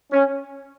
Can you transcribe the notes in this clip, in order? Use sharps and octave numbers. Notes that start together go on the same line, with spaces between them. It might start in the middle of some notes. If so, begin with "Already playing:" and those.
C#4